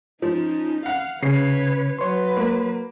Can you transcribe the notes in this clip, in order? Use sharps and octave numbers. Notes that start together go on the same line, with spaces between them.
F3 C#4 D#4
F5 F#5
C#3 C#4 B4 C#5 C7
F#3 B4 C#5 C6
A#3